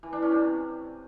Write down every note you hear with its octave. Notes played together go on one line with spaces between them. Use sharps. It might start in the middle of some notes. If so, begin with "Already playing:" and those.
E3
D4
C#4
C3